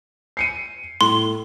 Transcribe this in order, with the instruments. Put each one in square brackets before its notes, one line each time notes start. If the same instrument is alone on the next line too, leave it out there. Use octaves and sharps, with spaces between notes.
[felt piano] C7 C#7 D#7
[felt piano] A2 [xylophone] C6